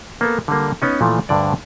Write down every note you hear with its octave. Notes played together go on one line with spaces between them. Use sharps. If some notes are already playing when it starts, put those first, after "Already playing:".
A#3 B3 A4
D3 G3 A#3
B3 C#4 D#4
A#2 E3 F3 A3
D2 G2 D3 D5